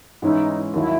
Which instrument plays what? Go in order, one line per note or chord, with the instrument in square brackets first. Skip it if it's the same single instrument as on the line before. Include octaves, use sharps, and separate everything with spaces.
[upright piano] G#2 E3 G#3 C#4 E4 [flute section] D#4
[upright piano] D#2 D#3 F#3 [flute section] E4